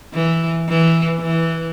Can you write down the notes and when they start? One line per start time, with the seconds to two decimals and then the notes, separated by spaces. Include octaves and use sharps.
0.14 E3
0.69 E3
1.20 E3